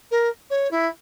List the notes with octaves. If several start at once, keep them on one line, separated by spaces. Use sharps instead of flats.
A#4
C#5
E4